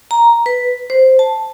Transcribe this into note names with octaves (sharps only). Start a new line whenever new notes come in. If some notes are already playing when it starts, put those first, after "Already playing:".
A#5
B4
C5
A5